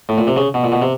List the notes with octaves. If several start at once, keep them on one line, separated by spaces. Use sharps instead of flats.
A2
A#2
C3
C#3
B2
A#2
B2
C3